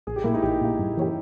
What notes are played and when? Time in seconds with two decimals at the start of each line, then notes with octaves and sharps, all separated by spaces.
0.07 A#1 G#4
0.16 G4
0.24 A#2 A#3 E4
0.34 D#4
0.42 A#1 G4
0.61 A#2 A#3
0.79 G2
0.97 E3 A#3 C#4 G4